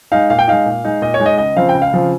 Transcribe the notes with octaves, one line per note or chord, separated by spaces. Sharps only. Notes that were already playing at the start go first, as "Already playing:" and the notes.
G#3 D#4 F5
A#2 F5
G5
G#3 D#4 F5
A#2
G#3 D#4
A#2 D#5
C#5
G#3 D#4
D#5
C#2 D#5
C#3 F3 C4 F5
G5
C#2
F5
C#3 F3 C4